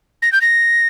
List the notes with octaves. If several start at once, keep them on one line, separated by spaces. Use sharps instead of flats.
A#6
G6
A#6